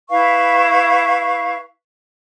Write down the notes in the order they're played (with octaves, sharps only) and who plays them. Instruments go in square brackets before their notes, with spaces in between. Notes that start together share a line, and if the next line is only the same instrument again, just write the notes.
[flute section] E4 B4 F5 C#6